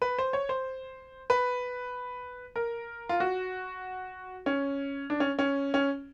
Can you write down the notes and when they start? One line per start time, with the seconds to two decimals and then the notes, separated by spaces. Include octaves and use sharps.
0.02 B4
0.18 C5
0.33 C#5
0.49 C5
1.30 B4
2.56 A#4
3.09 F4
3.20 F#4
4.46 C#4
5.10 D4
5.20 C#4
5.39 C#4
5.74 C#4